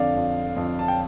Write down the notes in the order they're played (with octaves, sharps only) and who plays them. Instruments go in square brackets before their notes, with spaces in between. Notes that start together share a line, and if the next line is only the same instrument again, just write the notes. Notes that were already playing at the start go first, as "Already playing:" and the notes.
Already playing: [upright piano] F2 D3 D5 F5
F2
F2
A5
G5